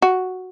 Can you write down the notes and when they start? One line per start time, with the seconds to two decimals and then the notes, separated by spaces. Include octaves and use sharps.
0.02 F#4